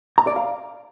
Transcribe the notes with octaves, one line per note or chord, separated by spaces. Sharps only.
A#5
D5
F5